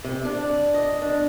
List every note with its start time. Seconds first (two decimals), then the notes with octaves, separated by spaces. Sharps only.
0.05 C3
0.25 D4
0.74 D#5
1.02 D4